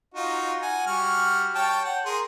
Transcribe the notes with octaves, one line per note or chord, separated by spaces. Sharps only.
D#4 F4 F#4
F#5 G#5
G3 F#4 F6
C#5 G5 A5
F#5
G#4 A#4 C6